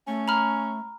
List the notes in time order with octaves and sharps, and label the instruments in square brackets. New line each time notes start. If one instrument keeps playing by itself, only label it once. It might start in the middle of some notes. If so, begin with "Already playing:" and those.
[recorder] A3 [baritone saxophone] C#4
[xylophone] A#5 B5 F6